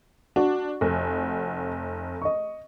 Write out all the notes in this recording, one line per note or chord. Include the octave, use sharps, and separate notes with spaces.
D4 F#4
F1
D#5 C#6